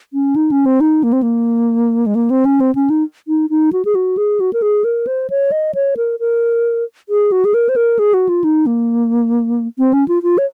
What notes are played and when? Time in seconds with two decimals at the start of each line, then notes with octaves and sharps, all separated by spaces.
0.13 C#4
0.36 D#4
0.51 C#4
0.66 C4
0.81 D#4
1.03 A#3
1.13 C4
1.22 A#3
2.06 G#3
2.15 A#3
2.30 C4
2.45 C#4
2.60 C4
2.75 C#4
2.90 D#4
3.28 D#4
3.50 D#4
3.73 F#4
3.85 G#4
3.95 F#4
4.17 G#4
4.40 F#4
4.53 A#4
4.62 G#4
4.84 A#4
5.07 C5
5.30 C#5
5.52 D#5
5.75 C#5
5.97 A#4
6.20 A#4
7.09 G#4
7.32 F#4
7.45 G#4
7.54 A#4
7.69 C5
7.76 A#4
7.99 G#4
8.14 F#4
8.29 F4
8.44 D#4
8.66 A#3
9.78 C4
9.93 C#4
10.08 F4
10.23 F4
10.38 C#5